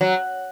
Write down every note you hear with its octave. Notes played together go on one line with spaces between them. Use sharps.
F#3